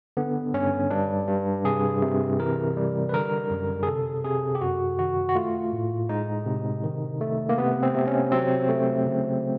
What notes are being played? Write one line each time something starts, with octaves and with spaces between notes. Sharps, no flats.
D3 B3
G2 C#4
G2 D4
G2
C3 G#4
C3
E3 A#4
G3
B4
D3 A#4
F#2
G#4
C3 A4
C3 G#4
G4
F#2 F#4
D#3 F#4
F#4
A3 F4
A2
G#3 D#4
C3
D#3
A3
A#3
C3 B3
C4
C3
C#4
F#3 C4
A3
C#3